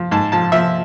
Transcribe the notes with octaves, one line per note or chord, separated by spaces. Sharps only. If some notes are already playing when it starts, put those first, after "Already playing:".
Already playing: F3
G#2 A5
F3 A5
F3 E5